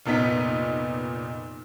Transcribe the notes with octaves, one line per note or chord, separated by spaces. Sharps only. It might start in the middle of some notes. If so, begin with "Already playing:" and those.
F1 A#2 B3 D#4 B6